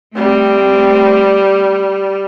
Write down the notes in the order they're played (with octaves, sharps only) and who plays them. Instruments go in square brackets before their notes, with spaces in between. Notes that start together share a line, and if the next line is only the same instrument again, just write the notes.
[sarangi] G3 [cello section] A3 C4